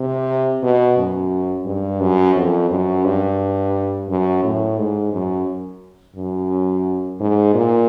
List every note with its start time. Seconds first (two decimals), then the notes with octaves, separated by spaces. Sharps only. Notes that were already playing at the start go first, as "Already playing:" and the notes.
Already playing: C3
0.63 B2
0.97 F#2
1.66 G2
2.01 F#2
2.36 F2
2.71 F#2
3.05 G2
4.09 F#2
4.44 A2
4.78 G#2
5.13 F#2
6.16 F#2
7.20 G#2
7.54 A#2